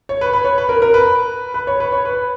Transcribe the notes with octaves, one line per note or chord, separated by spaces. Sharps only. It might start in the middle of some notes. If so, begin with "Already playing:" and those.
C#5
B4
B4
C#5
B4
A#4
A#4
B4
B4
C#5
B4
C#5
B4